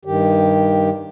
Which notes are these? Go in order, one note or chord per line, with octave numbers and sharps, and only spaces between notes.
G2 D#3 G4